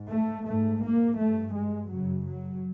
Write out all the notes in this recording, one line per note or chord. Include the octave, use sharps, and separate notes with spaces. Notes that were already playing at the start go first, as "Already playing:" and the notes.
Already playing: G#2
A3
G#2 A3
A#3
G2 A3
G#3
F#2 C#3 F#3
F#3